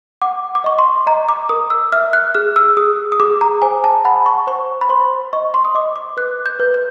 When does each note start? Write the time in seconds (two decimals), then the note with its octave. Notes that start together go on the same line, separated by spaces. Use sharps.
0.22 F#5 D6
0.55 D6
0.64 D#5 C#6
0.79 C6
1.07 D#5 A#5
1.29 D6
1.49 A#4 D#6
1.70 E6
1.92 E5 F6
2.13 F#6
2.34 G#4 F6
2.56 E6
2.77 G#4 D#6
3.12 D#6
3.20 G#4 D6
3.41 A#5
3.62 C5 G#5
3.84 A5
4.05 F#5 B5
4.26 C#6
4.47 C5 C#6
4.81 B5
4.89 C5 C6
5.33 D#5 C#6
5.54 C6
5.65 D#6
5.75 D#5 D6
5.96 D6
6.17 B4 F#6
6.46 G6
6.60 B4
6.74 G6